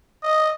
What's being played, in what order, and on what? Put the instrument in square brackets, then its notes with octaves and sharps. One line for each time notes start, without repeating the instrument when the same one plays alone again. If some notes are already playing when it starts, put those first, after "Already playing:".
[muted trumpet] D#5